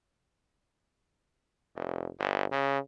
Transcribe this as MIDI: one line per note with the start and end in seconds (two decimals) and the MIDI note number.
1.75 2.08 29
2.19 2.45 31
2.52 2.79 49